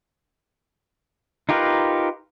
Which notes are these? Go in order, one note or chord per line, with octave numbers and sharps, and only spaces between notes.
D#4 F4 G4 A#4 B4